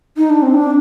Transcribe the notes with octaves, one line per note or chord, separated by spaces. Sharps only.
D#4
D4
C4
D4